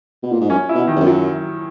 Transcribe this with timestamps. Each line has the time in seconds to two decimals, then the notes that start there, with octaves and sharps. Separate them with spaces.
0.23 B2
0.32 A#2
0.41 G#2
0.50 F#2 C#4
0.69 E4
0.74 B2
0.87 D#3
0.96 E2
1.00 F#2
1.07 F#3